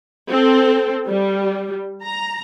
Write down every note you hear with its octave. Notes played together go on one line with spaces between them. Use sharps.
C4 A4
G3
A#5